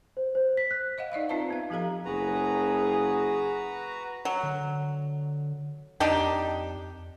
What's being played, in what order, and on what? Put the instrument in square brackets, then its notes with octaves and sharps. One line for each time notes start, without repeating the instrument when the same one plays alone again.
[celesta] C5
C5
B6
F#6
[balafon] C5 D#5 F5 F#5
D#4 D5 D#5 F5
C4 D#4 F4 B4 E5 A5
B3 F5
F3 B3 G4 A4 F5 A#5
[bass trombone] F#1 [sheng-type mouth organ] F#4 B4 A#5 [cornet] G#4
[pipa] F#3
[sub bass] D3
[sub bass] F2 [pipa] D4 D#4 G4